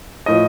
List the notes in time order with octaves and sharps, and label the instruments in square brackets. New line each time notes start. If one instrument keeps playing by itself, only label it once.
[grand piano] A2 F3 D#5